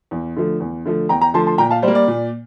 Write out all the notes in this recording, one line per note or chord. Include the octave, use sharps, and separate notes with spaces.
E2
D3 F3 A3
E2
D3 F3 A3
E2 G5 A#5
G5 A#5
D3 F3 A3 A5 C6
A5 C6
A#2 G5 A#5
F5 A5
G3 C5
A#3
D5
A#2